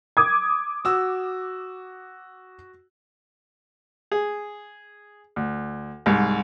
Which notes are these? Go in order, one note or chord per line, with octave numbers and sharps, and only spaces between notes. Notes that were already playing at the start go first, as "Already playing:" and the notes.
D6 D#6 G#6
F#4 E6
G#4
D2
C2 G#2